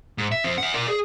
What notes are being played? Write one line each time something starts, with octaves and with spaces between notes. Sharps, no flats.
G#2
E5
F2 C4
E5 F#5
A#4 D5
G#4